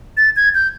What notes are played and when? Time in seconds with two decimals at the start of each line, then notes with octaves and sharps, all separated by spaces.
0.17 A6
0.36 G#6
0.54 G6